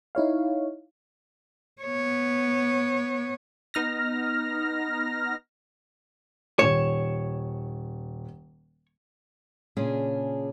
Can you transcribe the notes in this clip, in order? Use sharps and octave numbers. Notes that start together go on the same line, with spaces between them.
D#4 E4 C#5 F5
B3 C#5
B3 D#4 F6 A#6
D#1 C#5 E7
A#2 C#3 C#4 D4 G#4